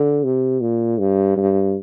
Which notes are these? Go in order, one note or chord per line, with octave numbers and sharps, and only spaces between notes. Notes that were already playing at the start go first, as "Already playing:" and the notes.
Already playing: D3
C3
A#2
G2
G2